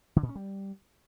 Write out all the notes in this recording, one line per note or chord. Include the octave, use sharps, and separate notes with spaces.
D3
A#2
C#4
G3